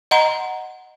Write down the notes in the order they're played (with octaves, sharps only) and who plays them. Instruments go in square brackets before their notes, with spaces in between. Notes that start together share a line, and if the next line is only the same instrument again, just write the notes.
[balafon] D#5 F#5 A#5 C6